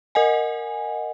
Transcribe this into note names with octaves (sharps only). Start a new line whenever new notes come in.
A#4 D#5 F#5 G#5